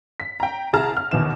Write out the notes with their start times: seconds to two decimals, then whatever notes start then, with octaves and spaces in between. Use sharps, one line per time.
0.20 B6
0.40 G5 A#5
0.73 C2 E4 G#4 A5 A#5 F6
0.97 F6
1.11 D#2 B2 E3 E7